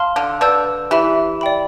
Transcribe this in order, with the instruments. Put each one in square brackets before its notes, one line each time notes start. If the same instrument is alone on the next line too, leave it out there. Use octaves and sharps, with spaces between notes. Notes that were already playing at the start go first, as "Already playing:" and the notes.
Already playing: [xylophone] F5 A5 C6 F6
[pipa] D3
[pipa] D3 [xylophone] B4 D5 A5 E6 G6
[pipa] E3 [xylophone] G4 B4 E5 B5
[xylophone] D5 G5 B5